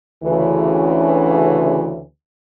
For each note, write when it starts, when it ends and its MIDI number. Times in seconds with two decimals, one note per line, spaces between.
0.24 2.04 38
0.24 2.04 49
0.24 2.04 52